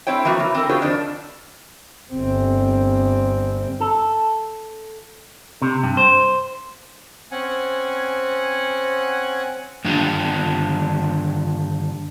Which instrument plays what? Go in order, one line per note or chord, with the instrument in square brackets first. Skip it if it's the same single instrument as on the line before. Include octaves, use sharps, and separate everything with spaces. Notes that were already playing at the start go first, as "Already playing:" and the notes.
[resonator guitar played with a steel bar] C4 E4 C#5 G5
E3 F3 A#3 F#4
E3
C4 A#4
F4 F#4 G#4 A#4 C5 C#5
F2 D#3 D4
[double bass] G1 C4
[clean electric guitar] A4
C3
G2
C5
[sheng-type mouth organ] C4 C#4 F#5 G#5
[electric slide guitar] G2 D3 D#3 D4 F4 G4